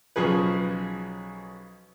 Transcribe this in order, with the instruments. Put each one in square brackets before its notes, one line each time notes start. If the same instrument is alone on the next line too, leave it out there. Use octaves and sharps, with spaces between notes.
[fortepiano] B1 C#3 F3 G#4 B4